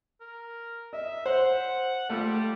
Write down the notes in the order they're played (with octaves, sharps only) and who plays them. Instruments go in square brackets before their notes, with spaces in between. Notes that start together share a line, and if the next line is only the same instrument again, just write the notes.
[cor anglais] A#4
[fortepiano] D#5 [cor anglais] E5
[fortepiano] C5 [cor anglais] F#5
[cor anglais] G3 [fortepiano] A3 F4 A4